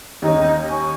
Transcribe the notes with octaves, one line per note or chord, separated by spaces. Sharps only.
D#2 C#4 D#4
G#5 C#6